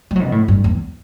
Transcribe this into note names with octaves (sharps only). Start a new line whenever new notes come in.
G3
F#3
B2
A2
G2
E2